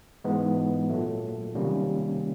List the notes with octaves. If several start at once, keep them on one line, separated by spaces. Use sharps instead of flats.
G#2 E3 G#3 B3
A#2 F#3 A3
C3 D#3 G3 A#3 C#4